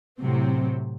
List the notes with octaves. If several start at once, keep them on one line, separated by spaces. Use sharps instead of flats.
A2 C3 F#3 C4